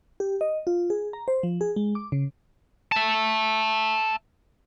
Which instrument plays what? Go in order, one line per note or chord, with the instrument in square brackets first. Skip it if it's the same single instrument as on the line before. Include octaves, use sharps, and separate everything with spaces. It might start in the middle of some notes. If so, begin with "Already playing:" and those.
[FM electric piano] G4
D#5
F4
G#4
A#5
C5
F3
G#4
G#3
D6
C#3
[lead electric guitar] E5 A5